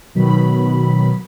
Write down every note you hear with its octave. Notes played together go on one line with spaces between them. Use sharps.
B2 D#3 F#3 B5